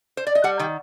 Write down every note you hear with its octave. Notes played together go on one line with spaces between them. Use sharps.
C5
D5
D#5
G3 F#5
D#3 G5